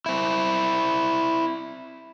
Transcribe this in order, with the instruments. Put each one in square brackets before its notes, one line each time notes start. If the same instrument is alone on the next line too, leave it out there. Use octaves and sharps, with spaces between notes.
[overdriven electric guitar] C4 E4